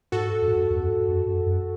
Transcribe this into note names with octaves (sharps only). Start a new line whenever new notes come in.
G#2 F#4 A4
F#2
G#2
F#2
E2
F#2
G#2
F#2
F#2
F#2